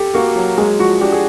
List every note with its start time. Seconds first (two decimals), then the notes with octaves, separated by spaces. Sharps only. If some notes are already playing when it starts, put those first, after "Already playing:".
Already playing: G4 A4
0.14 A#3 F#4
0.36 F#3
0.58 G#3 G#4
0.79 F3 F#4
1.01 D4 G4
1.12 G#4